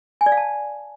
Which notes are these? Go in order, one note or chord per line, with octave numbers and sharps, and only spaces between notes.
G#5
D5
F5
A5